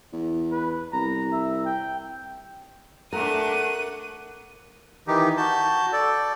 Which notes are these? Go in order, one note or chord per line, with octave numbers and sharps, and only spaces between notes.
E2
B4
C2 A#5
E5
G5
A3 D4 A#4 F#5 D#7
D#3 E3 D#4 G4
F#4 A5 G6
A4 D5